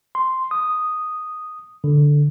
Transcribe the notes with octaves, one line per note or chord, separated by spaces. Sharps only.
C6
D#6
D3